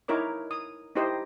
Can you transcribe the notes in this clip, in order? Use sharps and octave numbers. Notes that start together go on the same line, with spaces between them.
D#4 E4 A#4 C#5 D6
D#6
D#4 E4 G4 C5 D#5